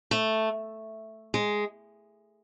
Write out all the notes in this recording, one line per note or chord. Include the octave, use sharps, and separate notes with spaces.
A3
G#3